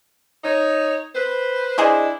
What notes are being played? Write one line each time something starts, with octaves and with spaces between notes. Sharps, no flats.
D#4 C#5
B4 C5
D4 E4 G#4 C5 D#5